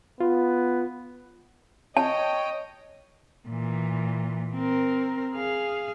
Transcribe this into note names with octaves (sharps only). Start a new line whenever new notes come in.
B3 F4
C#5 D#5 G5 A5
A#2 E3
C4 A#4
G#4 F5